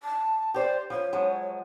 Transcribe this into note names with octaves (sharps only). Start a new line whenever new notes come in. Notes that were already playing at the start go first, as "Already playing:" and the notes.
A5
G4 C5 D5
F3 C#5
F3 F#3 G#3